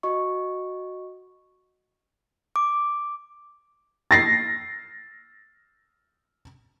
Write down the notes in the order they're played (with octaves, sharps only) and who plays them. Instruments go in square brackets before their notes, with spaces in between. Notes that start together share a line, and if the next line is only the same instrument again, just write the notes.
[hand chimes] F#4 D#5 C#6
D6
[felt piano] A6 A#6 C7